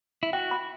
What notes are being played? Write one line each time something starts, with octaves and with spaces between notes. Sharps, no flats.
E4
F#4 G5
B5